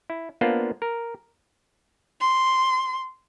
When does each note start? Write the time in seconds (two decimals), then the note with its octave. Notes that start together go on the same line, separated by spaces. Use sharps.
0.10 E4
0.41 A#3 B3 D4 F4 C5
0.82 A#4
2.21 C6